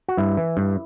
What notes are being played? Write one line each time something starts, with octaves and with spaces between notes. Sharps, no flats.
F#4
G2 E4
E3
G2